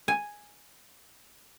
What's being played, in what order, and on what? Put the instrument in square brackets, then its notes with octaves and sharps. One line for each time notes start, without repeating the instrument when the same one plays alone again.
[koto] G#5